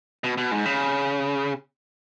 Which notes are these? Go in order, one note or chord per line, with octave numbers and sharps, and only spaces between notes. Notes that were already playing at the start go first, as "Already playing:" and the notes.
B2
B2
G#2
C#3